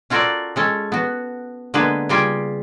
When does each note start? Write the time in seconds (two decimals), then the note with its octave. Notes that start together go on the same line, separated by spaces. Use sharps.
0.10 C#4 F4 F#4 A4 A#4 D5
0.56 G#3 C#4 A4
0.92 B3 F#4
1.74 D3 G#3 A#3 B3 G#4 B4
2.09 C#3 G3 F4 G4 G5 G#5